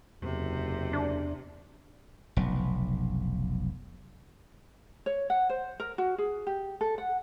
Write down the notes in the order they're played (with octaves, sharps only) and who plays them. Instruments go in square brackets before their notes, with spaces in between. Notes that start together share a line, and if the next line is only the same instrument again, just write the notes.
[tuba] F#1 [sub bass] E2 [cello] C3
[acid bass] D4
[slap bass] F1 B1
[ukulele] C#5
F#5
C5
A#4
F#4
G#4
G4
A4
F#5